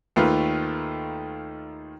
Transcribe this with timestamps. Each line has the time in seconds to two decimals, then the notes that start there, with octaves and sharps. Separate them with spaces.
0.16 D#2 D#3 A3 F4 B4